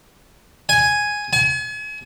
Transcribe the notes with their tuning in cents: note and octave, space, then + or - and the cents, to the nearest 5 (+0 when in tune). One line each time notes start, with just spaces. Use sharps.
G#5 +0
G#5 +40